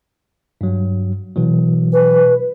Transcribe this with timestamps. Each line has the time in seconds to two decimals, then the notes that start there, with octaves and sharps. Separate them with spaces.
0.61 G2 F#3
1.36 B2 E3 F#3
1.92 B4